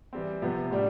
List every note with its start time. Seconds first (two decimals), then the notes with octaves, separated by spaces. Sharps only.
0.13 E3 G3 C4
0.42 C3 F3 B3
0.71 A2 G3 D4